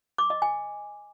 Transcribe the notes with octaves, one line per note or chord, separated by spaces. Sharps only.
D6
D#5
G#5